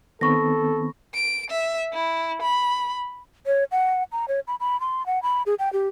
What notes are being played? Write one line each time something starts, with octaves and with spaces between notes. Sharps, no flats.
D#3 B3 C4 A4 B5 C#6 A#6
D7
E5
E4
B5
C#5
F#5
A#5
C#5
B5
B5
C6
F#5
B5
G#4
G5
G4